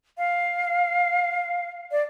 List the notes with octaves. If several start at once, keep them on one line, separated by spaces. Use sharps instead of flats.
F5
D5